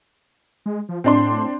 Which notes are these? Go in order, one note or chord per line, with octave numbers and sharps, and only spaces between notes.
G#3
F3
A2 C4 D4 C6